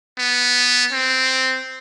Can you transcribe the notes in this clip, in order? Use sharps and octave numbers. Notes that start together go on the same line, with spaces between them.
B3
C4